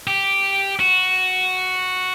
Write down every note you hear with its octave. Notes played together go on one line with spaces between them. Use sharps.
G4
F#4